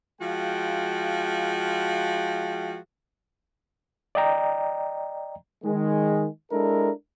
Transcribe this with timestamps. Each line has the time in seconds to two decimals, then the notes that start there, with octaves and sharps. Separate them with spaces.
0.21 F3 G#3 F#4 F5 G5
4.15 D5 D#5 G5 A#5
5.64 D#3 G#3
6.52 G#3 D4 E4 A4 A#4